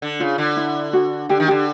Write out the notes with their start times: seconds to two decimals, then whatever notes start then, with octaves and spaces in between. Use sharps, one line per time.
0.02 D3
0.20 C#3 F4
0.38 D3
0.57 E4
0.93 F#4
1.29 D3 G4
1.40 D#3
1.48 D3 G4